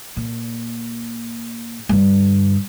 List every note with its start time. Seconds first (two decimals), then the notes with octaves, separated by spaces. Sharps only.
0.17 A#2
1.89 G2 D3